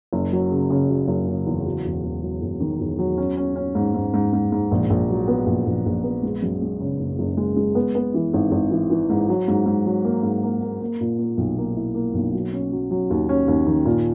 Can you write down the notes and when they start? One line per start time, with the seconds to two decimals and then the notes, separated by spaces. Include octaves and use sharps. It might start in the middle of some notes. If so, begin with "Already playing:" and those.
0.13 F#1
0.32 F#3
0.52 C#3
0.70 C#3
0.90 F#3
1.08 F#1
1.28 C#3
1.47 E2
1.66 F#3
1.85 E1
2.03 E1
2.23 F#3
2.42 E1
2.60 D#3
2.80 E1
2.99 F#3
3.18 C#4
3.37 C#4
3.56 C#4
3.75 G#2
3.94 G#2
4.14 G#2
4.33 G#2
4.52 G#2
4.71 A#1
4.90 A#1
5.09 F#3
5.28 B3
5.46 A#1
5.66 A#1
5.86 A#1
6.04 B3
6.23 G#3
6.42 F#2
6.62 G#3
6.80 C#3
6.99 F#1
7.19 F#1
7.37 G#3
7.57 G#3
7.75 B3
7.95 B3
8.14 E3
8.34 G#1
8.51 G#1
8.71 E3
8.90 E3
9.10 G#2
9.29 F#3
9.48 G#2
9.66 G#2
9.86 F#3
10.05 A#3
10.23 G#2
10.43 A#3
10.62 A#3
10.81 A#3
11.01 A#2
11.19 A#3
11.38 B1
11.58 A#3
11.77 E4
11.95 A#3
12.14 B1
12.33 F#3
12.53 C#4
12.72 F#3
12.91 F#3
13.10 D#2
13.29 C#4
13.48 D#2
13.66 D#3
13.85 A#2